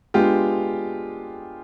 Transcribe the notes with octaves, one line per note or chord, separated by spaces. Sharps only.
G#3 B3 D4 F4 G4